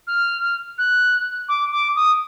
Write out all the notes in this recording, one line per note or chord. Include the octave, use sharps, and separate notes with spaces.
F6
F#6
D6
D6
D#6